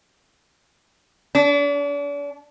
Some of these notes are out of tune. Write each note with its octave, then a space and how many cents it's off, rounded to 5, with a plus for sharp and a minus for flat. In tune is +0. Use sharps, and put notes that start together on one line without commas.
D4 -40